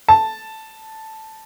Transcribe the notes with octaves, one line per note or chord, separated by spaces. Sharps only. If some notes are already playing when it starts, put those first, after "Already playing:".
A5